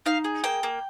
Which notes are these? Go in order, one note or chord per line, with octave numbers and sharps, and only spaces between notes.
D#4 F5
G#4
A#3 G5
A#3